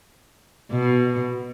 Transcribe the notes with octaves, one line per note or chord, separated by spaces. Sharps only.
B2